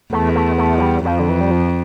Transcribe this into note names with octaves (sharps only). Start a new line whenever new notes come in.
E2 A3
A3
A3
F3
G3
F2 F3
D3
E3
G3
F3